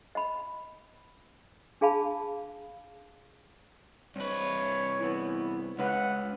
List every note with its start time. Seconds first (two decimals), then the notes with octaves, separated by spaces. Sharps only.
0.15 D#5 B5
1.81 D4 G#4 F5 A5 B5
4.16 C2 B4 C#5
5.01 E3 B3
5.79 C#2 C#4 B4 F#5